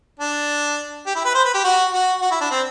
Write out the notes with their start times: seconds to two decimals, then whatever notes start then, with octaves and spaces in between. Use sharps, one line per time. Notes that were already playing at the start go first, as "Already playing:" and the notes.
0.20 D4
1.06 G4
1.16 E4
1.25 B4
1.35 C5
1.45 B4
1.54 G4
1.64 F#4
1.93 F#4
2.22 F#4
2.31 E4
2.41 D4
2.51 C4